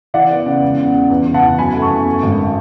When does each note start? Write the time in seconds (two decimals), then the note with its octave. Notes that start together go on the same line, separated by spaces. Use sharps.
0.14 E3 D5 F#5
0.30 B3
0.46 C#3
0.62 E1
0.78 C#3
0.94 C#3
1.10 E2
1.27 E2
1.34 F#5 A5
1.42 E2
1.58 F#2 G#5 B5
1.74 A3
1.82 A5 C#6
1.90 F#2
2.06 A3
2.22 G#1